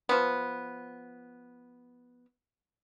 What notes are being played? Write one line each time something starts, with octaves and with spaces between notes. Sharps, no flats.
F3 B3